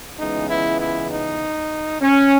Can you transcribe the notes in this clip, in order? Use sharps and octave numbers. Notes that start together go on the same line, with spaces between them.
C#2 C#3 E3 G#3 B3 D#4
E4
E4
D#4
C#4